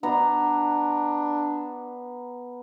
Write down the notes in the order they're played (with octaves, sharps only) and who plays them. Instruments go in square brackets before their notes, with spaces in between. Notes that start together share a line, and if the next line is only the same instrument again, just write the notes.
[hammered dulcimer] B3 A#5 [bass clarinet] D4